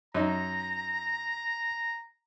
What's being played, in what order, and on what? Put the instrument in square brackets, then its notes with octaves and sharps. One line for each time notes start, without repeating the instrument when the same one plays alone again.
[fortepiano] F#2 D#4 [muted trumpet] A#5